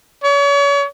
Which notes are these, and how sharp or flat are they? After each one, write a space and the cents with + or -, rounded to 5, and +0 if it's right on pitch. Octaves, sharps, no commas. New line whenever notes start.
C#5 +35